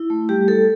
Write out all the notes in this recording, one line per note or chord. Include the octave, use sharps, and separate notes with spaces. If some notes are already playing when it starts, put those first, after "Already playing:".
Already playing: E4
A3
G3 G4
G3 A4